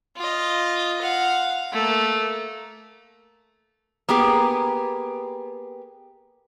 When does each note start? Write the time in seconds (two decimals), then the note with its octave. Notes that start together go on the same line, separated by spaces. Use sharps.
0.17 F4 D#5
1.02 F5 F#5
1.72 A3 A#3
4.09 A#3 B3 G4 G#4